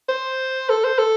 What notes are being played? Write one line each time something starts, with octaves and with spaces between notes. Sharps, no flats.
C5
A4
C5
A4